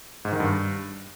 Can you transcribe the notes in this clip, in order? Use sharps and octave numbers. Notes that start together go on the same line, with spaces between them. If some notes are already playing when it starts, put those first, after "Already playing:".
G#2
D#3
G2